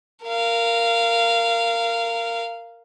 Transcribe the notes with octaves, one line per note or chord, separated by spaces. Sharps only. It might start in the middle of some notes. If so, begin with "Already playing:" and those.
A#4 F5